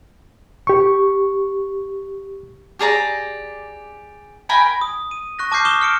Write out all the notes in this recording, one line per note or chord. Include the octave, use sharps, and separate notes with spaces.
G4 C#6
G4 G#4 D5 A#5
A#4 G5 G#5 B5
D#6
D#7
C#6 F#6 A#6
A5 D6 F6 G6 C7
C#6 D#6 E7 G7
F6 C#7 D7